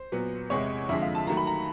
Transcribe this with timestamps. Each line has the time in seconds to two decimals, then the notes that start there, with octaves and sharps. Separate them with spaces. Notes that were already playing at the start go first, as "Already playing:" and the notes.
Already playing: C5
0.12 A#2 F#3 B3
0.50 E2 C3 E3 G#3 C#5
0.89 F2 D3 F3 G#3 E5
1.02 F5
1.15 A5
1.27 D#3 F#3 A3 A#5
1.37 B5
1.47 A#5